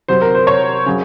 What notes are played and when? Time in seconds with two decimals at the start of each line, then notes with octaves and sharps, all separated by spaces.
0.08 C3 F#3 C5
0.22 A#4
0.35 C5
0.47 C#5
0.86 C#3 F#3